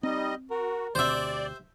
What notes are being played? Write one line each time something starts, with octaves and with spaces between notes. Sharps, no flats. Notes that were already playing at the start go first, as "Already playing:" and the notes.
G3 C4 D#4 D#5
F#4 A#4
D2 B2 C4 G4 C5 D5 E5